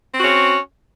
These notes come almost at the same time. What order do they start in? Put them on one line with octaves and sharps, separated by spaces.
C4 F#4 C#4